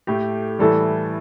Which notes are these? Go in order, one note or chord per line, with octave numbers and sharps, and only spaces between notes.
A2 A3 G4
A2 E3 G3 A4